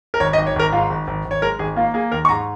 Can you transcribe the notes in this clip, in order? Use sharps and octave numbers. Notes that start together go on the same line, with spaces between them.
A#4
G#1 C#5
D#5
G#1
C#5
G#1 A#4
G#2 F4
G#1
G#1
G#1
C#5
G#3 A#4
G#1 G#4
A#3 F4
A#3 G#4
D#2 A#4
C#6
G#2 A#5